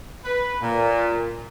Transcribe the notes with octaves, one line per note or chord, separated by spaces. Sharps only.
B4
A#2